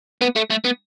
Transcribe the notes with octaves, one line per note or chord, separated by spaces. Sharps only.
B3
A3
A3
B3